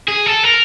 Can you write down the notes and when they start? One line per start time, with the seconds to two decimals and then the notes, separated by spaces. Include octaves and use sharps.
0.08 G#4
0.26 A4
0.44 A#4